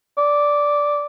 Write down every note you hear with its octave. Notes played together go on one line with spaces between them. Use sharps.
D5